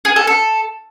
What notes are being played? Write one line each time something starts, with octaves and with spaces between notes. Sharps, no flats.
G#4
A4
A4